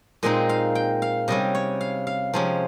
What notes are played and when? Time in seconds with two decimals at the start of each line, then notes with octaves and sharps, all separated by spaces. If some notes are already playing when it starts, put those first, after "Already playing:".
0.23 A#2 G#3 C4 D#4 D#5
0.49 F5
0.75 G5
1.02 F5
1.28 C3 G3 C#4 D#5
1.55 C#5
1.81 F5
2.07 F5
2.34 C3 F3 G#3 C#4